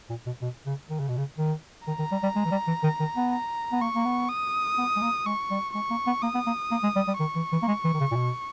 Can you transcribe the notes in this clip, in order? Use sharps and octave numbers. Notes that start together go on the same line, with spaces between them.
A#2
B2
B2
C#3
D#3
C#3
B2
C#3
D#3
D#3 A#5
D#3
G3
G3
G#3
E3
G3
E3
D#3
D#3
B3
A#5
B3
A#3 C#6
A#3
B3
D#6
B3
G#3
A#3
G#3 C#6
G3
G#3 C#6
A#3
B3
A#3 D#6
B3
A#3
A#3
G#3
G3
G3
D#3 C#6
E3
E3
A#3
G#3
E3
D#3
C#3
A#2
B2